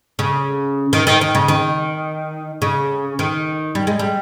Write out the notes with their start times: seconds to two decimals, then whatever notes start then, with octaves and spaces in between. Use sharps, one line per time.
0.19 C#3
0.93 D#3
1.07 D#3
1.21 D#3
1.35 C#3
1.48 D#3
2.62 C#3
3.19 D#3
3.75 G3
3.87 G#3
3.99 G3